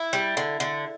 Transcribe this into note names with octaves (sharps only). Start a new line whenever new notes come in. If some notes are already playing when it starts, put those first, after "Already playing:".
Already playing: E4
G3
D3
D3